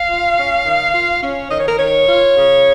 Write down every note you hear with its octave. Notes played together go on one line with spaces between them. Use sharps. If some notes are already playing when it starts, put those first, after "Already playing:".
Already playing: F5
F4
C#4
D#3
F4
C#4
D#3 D#5
C#5
A#4
D#3 C#5
F4
C#3